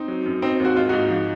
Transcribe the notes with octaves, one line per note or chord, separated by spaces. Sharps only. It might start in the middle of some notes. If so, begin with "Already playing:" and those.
Already playing: C4 D#4
F#3
F#2
F#3 C4 D#4
D#2 F#4
G#2 F4
G#2 D#4 F#4
F3